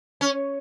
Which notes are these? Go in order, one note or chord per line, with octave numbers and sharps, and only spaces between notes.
C#4